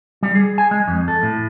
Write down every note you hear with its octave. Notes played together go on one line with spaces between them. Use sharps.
G3
G#4
G#5
G#3
F2
A4
A2